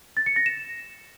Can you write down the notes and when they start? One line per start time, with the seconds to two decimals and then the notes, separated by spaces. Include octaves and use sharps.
0.17 A6
0.26 C#7
0.36 A#6
0.46 E7